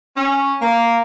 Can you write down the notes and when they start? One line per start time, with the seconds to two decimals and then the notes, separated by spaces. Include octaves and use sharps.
0.17 C#4
0.62 A#3